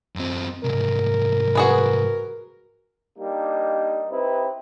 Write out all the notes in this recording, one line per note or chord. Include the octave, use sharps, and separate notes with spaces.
F#2 C4
C2 G#2 A#4
F#4 G#4 B4
G3 A#3 D4 D#4
C4 D#4 E4 G4 B4